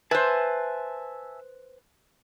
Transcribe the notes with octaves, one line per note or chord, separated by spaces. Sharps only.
B4 C5 E5 G#5 A5